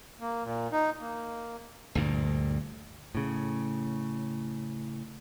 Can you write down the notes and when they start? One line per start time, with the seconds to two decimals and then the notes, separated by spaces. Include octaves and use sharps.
0.21 A#3
0.44 A#2
0.72 D#4
1.00 A#3
1.95 D2 G2 A#2
3.15 A2 C#3